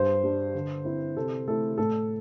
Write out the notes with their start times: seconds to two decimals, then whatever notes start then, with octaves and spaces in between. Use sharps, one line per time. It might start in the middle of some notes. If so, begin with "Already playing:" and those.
Already playing: G2 C5
0.24 G3 D4
0.54 D3
0.85 C4 E4
1.17 C3 A4
1.48 A3 E4 A4
1.78 A2 A4